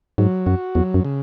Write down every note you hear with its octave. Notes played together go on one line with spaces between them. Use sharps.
G#2 F#3
F#2 F#4
E2 F#3
F#2
C#3